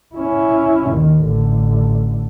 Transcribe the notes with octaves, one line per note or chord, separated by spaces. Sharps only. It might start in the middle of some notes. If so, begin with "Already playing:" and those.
C#4 E4
D#2 D#3
A1 D3